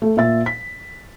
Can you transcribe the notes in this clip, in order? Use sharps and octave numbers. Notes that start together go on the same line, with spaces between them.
A3
A#2 E5 A6
B6